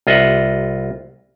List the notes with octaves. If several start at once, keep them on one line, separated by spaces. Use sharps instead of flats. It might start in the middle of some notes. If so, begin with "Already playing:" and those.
C2 F4 D#5 E5 F#5